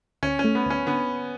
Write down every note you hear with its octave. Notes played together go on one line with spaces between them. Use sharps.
D2 C#4
C#4
A3
B3
D2 C#4
D3 B3